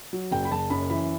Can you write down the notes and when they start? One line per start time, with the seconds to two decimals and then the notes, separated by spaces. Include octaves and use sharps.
0.13 F#3
0.32 F#1 G5
0.45 B5
0.51 F#1 A5
0.70 F#2 B5
0.90 E3 B5